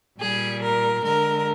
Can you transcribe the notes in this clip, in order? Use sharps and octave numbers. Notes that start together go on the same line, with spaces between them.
A#2 G3 G#4
A#4
D3 G#3 A#4